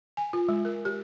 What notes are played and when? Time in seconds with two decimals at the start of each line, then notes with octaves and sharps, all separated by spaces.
0.17 G#5
0.33 F4
0.49 G#3
0.65 A#4
0.85 G4